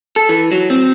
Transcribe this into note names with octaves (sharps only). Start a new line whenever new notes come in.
A4
E3
F#3
C4